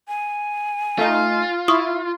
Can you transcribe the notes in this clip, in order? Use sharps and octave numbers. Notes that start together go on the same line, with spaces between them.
G#5
A3 D#4 F4
E4 C#6 D#6